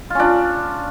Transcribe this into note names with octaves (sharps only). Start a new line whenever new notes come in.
C#4 D4 F4